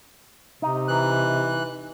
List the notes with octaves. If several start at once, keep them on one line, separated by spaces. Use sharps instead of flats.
C3 D#4
E3 F#6